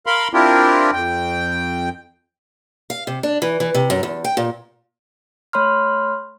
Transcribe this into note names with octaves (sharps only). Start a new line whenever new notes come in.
A#4 F5 B5 C6
C4 D4 E4 F4 G4 A#4
F2 G5
F5
C3
D4
E3
E3
C3
F#2
E2
G5
A#2
A3 C#5 B5 C6 F6